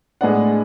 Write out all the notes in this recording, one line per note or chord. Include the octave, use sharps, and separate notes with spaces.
A2 G#3 B3 D4 F#5